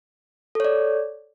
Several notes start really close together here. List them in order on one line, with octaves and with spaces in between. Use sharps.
A4 C#5 D5